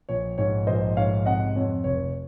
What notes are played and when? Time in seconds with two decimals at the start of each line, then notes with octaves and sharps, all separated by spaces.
0.09 A#1 C#5
0.38 G#2 C#5
0.67 A#1 C5 D#5
0.97 G#2 C#5 F5
1.26 C3 D#5 F#5
1.56 F2 C#5
1.84 F1 C#5